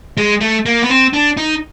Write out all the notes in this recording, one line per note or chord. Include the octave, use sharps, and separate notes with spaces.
G#3
A3
A#3
B3
C4
D4
D#4